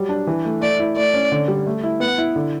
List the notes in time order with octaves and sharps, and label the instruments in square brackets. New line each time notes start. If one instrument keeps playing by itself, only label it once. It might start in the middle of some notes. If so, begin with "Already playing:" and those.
Already playing: [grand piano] F#3 G3
D4
E3
A3
[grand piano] A3 [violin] D5
[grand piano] E4
[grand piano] A3 [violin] D5
[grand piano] C#4
D3
G3
A3
E4
[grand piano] B3 [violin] F#5
[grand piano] E4
D3